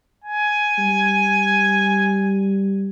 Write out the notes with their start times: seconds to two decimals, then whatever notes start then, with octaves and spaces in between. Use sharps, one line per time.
0.24 G#5
0.78 G3